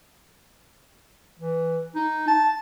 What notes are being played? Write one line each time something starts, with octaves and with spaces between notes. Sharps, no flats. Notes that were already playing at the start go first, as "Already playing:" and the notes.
E3
D#4
A5